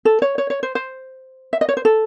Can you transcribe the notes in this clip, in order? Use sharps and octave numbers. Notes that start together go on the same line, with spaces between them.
A4
C#5
C#5
C#5
C5
C5
E5
D#5
C#5
C5
A4